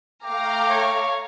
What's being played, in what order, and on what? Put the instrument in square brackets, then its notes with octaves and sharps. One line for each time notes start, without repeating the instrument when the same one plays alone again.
[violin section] A3 F5 A#5 [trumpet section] G5 D6
[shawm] C#5